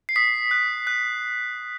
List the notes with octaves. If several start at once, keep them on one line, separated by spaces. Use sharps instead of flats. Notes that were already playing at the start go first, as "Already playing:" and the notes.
C7
D#6 B6
F#6
F#6